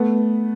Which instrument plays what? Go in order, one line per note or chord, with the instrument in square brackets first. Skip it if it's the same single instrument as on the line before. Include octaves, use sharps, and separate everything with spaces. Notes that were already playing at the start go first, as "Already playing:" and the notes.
Already playing: [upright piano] A3 B3